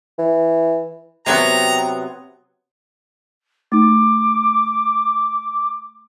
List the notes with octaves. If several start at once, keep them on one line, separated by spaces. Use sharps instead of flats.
E3
C3 F#3 B3 G5 A#5
A3 D#4 D6